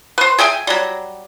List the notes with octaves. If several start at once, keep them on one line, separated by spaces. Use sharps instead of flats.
B4 C5
G#4 E5 G5 G#5
F#3 G3